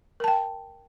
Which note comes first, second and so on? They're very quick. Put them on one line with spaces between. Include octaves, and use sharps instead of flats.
A#4 A5 G5